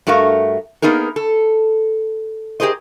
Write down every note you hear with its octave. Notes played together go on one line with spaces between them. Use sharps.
G2 A3 F#4 A#4 F5
A#3 B3 D#4 G#4 A#4
A4
G4 G#4 A#4 C5 D#5